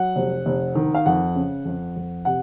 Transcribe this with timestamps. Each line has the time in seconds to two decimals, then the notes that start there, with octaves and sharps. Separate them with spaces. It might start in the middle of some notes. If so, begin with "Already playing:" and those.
Already playing: F#3 F#5
0.16 F1
0.46 F1
0.75 D#3
0.95 F5
1.06 F2 F#5
1.35 C#3
1.65 F2
1.96 F2
2.25 C3 F#5